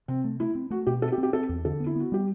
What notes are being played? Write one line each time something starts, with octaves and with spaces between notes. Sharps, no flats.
C3 C4
A3
A3 E4
C4
A3 F#4
B2 G4
C4 A4
G4
C4
G4
C4 A4
E2
D3 A4
B3
E4
B3 F#4
G3 G4